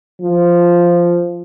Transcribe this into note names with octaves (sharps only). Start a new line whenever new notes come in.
F3